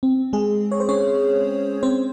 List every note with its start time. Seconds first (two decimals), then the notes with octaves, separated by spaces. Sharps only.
0.03 C4
0.33 G#3 G#4
0.71 C#5
0.80 C5
0.89 C#4 C#5
1.83 C4 C5